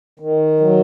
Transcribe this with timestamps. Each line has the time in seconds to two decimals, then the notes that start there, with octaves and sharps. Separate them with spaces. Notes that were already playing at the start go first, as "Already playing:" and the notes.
0.20 D#3
0.60 F#3